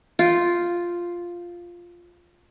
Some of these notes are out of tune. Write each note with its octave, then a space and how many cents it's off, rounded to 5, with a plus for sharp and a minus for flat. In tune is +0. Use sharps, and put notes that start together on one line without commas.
F4 +0 G5 -20